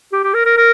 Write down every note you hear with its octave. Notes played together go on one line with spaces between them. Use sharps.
G4
G4
A#4
A#4
A#4